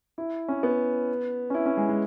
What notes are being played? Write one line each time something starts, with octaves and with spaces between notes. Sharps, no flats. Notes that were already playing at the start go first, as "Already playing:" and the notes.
E4
C#4
B3
C#4
E4
C#4
G#3
G#3